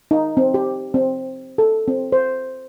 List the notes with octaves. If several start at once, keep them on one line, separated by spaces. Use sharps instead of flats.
D#4
C4
G4
C4
A4
C4
C5